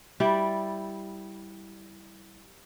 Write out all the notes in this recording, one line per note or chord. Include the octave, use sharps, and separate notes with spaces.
G3 E4 D5 G5